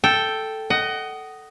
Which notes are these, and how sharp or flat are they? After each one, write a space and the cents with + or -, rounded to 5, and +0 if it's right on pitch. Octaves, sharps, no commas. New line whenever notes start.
A4 +0 G5 +0
D#5 +0 F#5 +25